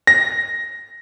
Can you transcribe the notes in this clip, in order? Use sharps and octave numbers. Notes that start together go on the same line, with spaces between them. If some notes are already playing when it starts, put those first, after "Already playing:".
A#6